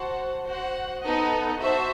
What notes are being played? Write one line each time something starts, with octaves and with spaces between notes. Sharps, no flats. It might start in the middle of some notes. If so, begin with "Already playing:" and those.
Already playing: F#4 C5 F#5 A5
F#4 C5 F#5
B3 D#4 A4 D#5 F#5
F#4 C5 E5 A5